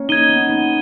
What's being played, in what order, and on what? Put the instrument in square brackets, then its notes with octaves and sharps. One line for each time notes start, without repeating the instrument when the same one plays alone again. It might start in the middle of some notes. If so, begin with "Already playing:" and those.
Already playing: [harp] A#3 C#4
[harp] D#4 [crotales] G#6 D#7 G7
[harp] B3
B3